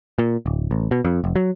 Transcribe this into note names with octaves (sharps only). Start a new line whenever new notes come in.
A#2
D1
A1
B2
F2
F1
F#3